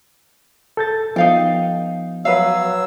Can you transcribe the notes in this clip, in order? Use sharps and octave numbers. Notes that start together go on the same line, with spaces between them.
A4 G6 A6
F3 B3 D#4 F5 G5
F#3 B4 F5 E6